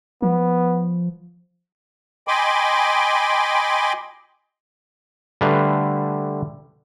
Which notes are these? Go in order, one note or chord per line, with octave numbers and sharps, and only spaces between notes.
F3 B3
D#5 G5 G#5 B5 C6 D6
D3 G3 A3 B4 F5